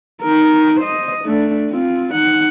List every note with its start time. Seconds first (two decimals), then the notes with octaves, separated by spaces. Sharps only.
0.23 D#4 A#4
0.80 C5 D#5
1.25 A3 D4
1.70 C4 F4
2.14 D#4 F#5